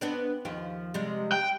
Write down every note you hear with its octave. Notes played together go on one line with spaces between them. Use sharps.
B3 C4 D4
D#2 F3 G4
C3 G3 G#3
G5